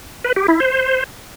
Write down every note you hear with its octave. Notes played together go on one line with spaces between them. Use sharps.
B4
G4
E4
C5